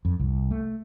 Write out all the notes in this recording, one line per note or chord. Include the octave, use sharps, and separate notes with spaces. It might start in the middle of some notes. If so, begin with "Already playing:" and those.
F2
C2
A3